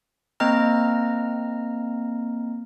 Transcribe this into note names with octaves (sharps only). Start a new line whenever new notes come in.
A#3 C4 D#5 A#5 F6